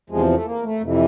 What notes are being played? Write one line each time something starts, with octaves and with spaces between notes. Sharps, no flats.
E2 C3 F3 G#3
A3
A#3
A3
F2 C3 E3